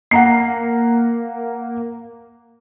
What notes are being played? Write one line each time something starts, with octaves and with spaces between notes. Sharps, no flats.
A#3 F#5 A#5 C7